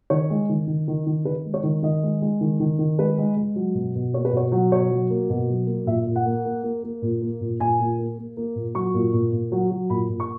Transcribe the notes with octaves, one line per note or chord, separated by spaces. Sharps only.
D#3 C#5
G#3
D#3
D#3
D#3
D#3
D#3 B4
G#3
C#5
D#3
D#3 D#5
G#3
G#3
D#3
D#3
D#3
G#3 B4
G#3
G#3
F#3
B2
B2
A#3 C#5
B4
B2 C#5
F#3
B2 C#5
F#3
A#3
B2
F#3
A#3
A#2 E5
A#2
F#5
A#3
A#3
A#3
A#3
A#2
A#3
A#2
A#2 G#5
A#2
A#3
A#3
A#3
A#2
F#3 C#6
A#2
A#2
A#2
F#3
F#3
A#2 B5
A#2
C#6